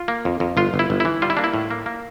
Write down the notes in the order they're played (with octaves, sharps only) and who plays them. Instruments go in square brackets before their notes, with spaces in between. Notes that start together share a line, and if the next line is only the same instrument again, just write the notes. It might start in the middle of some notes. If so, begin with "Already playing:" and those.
Already playing: [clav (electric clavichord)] F4
A#3
F2
F2
G1 F4
G1
E4
G1
E3 E4
G3 F4
E4
A#3 D4
E4
A2
A#3
A#3